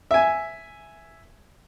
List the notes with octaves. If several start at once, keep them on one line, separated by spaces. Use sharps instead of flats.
E5 G#5